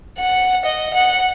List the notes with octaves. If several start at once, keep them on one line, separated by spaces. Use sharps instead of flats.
F#5
D#5
F#5